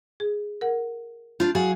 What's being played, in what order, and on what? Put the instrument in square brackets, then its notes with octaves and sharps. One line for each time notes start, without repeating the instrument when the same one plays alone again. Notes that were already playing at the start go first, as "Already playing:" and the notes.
[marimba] G#4
A#4 F#5
[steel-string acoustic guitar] D4 F4 [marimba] G6
[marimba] F#3 [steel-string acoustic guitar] F#4 G#4 F5